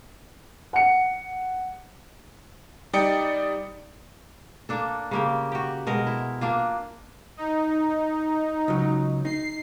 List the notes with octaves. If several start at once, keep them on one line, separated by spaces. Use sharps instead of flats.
F#5 C#7
G3 D#4 D5 G5 D#6 C#7
A#3 D4 A4
C#3 A#3 G4
F#4 G4
B2 G#3 A#4
E4
A#3 D4 F4
D#4
C#2 F#3
D#4 C7